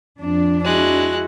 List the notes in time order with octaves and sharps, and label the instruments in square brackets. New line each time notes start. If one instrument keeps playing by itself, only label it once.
[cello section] F2 D4
[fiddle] G#3 F#6 [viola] E4 F#4